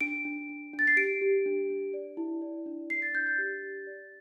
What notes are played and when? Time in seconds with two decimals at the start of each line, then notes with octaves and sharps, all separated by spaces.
0.01 D4 D7
0.25 D4
0.49 D4
0.73 D4
0.79 A6
0.87 C7
0.97 G4 D7
1.21 G4
1.46 D4
1.70 D4
1.94 D5
2.17 E4
2.42 D5
2.66 D4
2.90 D5 C7
3.02 A6
3.14 D4 G6
3.27 A6
3.38 G4
3.63 G4
3.87 D5